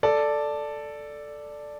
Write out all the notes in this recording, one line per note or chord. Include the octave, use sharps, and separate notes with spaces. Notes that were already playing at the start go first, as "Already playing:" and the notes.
A4 D5